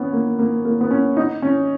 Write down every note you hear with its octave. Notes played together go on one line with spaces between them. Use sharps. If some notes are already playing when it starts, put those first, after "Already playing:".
Already playing: B3 C#4
A#3
A#3
A#3
B3
C#4
D#4
C#4